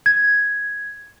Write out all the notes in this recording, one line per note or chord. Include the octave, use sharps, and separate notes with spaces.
G#6